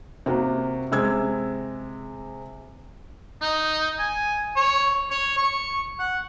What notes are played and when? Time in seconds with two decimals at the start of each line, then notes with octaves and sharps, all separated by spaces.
0.26 C3 A#3 F#4
0.92 C3 G#3 E6 G#6
3.41 D#4
3.99 G#5
4.56 C#5
5.11 C#5
5.38 C#6
5.99 F#5